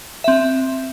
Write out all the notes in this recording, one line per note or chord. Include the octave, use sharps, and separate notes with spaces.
C4 E5